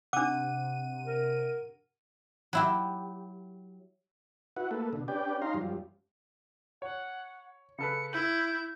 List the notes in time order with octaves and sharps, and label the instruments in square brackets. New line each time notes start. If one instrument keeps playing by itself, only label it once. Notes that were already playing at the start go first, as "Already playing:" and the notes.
[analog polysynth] C3 D#7 [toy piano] D4 D6 [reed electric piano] F#5
[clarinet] A#4
[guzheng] F#3 E4 G4
[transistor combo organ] E4 F#4 B4 F#5
A3 A#3 A4 B4
B2 D3
C#4 D4 G4 B4 D5 G5
C#4 D#4 F5 A#5 C6
F#2 F3 G3
[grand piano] C#5 [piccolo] F#5
[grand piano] C#3 A4 B4 [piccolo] C#7
[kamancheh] E4 [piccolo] G6 [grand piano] F#7